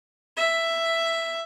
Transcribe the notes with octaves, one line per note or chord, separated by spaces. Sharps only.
E5